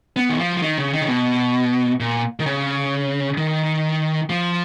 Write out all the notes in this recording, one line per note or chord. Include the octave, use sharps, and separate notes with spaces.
B3
D#3
F3
F3
D#3
C#3
D#3
C#3
B2
A#2
D#3
C#3
D#3
F3